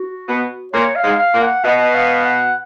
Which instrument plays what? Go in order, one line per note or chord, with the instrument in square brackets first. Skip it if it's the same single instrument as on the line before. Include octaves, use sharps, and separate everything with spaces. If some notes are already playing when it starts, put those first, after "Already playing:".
Already playing: [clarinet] F#4
[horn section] B2 B3
[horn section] A#2 A#3 [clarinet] C#5
[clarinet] F5
[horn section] G#2 G#3
[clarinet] F5
[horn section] A#2 A#3
[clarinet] F#5
[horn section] B2 B3 [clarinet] D#5
[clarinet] F5
F#5